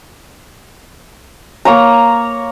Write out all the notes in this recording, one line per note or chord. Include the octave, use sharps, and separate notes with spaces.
A#3 C#5 A#5